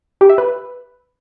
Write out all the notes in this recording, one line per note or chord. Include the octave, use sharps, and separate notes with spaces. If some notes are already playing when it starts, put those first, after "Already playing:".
G4
E5
B4